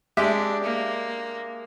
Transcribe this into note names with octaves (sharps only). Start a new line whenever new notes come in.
G#3 D4 G4 E5
A#3